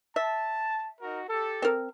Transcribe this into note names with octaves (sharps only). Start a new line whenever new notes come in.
E5 A5
D#4 F#4 A#4
G4 A4
C4 A#4